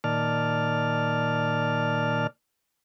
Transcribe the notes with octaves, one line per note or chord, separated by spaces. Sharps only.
A#2 D#3 D5 A5 F6